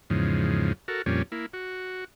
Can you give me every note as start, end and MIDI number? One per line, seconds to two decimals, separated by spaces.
0.10 0.73 40
0.10 0.73 44
0.10 0.73 49
0.10 0.73 53
0.88 1.02 66
0.88 1.02 69
0.88 1.02 70
1.06 1.22 41
1.06 1.22 46
1.06 1.22 55
1.06 1.22 61
1.32 1.46 58
1.32 1.46 64
1.53 2.04 66